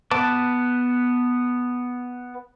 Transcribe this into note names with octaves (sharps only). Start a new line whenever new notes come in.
B3 B4 A5 D6